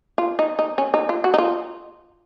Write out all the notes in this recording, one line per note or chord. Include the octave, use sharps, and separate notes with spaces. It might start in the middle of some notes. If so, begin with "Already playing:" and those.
F4
D#4
D#4
C#4
D#4
F4
F#4
D#4
F4